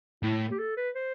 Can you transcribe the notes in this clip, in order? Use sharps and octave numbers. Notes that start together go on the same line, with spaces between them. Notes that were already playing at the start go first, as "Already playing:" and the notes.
A2 E4
G4
A4
B4
C5